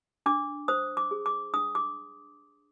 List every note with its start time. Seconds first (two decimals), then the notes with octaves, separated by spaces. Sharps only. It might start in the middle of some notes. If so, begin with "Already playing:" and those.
0.26 D4 D6
0.68 C5 D#6
0.97 D6
1.11 G#4
1.26 D6
1.53 D4 D#6
1.75 D6